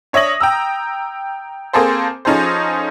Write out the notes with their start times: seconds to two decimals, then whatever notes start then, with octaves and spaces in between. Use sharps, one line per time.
0.13 D4 C#5 E5 D#6 A#6 F#7
0.40 G5 A#5 E6
1.73 A#3 C4 G#4 A4 C5
2.25 F3 C#4 D#4 G#4 A4 C5